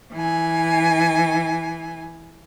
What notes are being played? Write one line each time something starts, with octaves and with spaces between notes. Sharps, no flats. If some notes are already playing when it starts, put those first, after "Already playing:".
E3 G#5